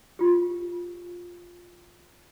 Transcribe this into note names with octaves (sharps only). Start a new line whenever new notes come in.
F4 G4